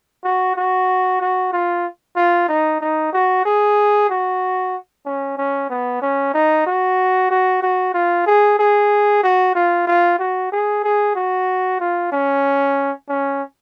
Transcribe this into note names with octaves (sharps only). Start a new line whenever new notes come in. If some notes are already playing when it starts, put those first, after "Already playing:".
F#4
F#4
F#4
F4
F4
D#4
D#4
F#4
G#4
F#4
C#4
C#4
B3
C#4
D#4
F#4
F#4
F#4
F4
G#4
G#4
F#4
F4
F4
F#4
G#4
G#4
F#4
F4
C#4
C#4